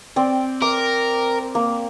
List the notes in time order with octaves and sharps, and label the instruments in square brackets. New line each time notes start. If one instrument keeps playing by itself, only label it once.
[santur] C4 D5
[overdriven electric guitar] A#4 [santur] D6
[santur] A#3